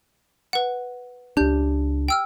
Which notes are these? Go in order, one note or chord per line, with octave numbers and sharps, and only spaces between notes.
B4 F#5
C#2 D4 G4 G6
G5 E6 F6